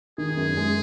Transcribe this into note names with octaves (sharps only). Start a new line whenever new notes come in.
D#3 G#4
F#2
G#3